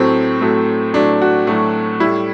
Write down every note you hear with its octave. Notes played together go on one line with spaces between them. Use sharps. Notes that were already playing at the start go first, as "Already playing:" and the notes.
Already playing: A2 F#3 A3 C4
A2 F#3 A3
A2 F#3 A3 D4
F#4
A2 F#3 A3
A2 G3 E4